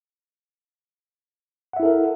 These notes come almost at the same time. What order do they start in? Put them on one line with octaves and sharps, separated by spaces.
F#5 E5 E4 A4 A#4